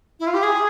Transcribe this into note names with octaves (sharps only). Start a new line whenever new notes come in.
E4
F4
G4
G#4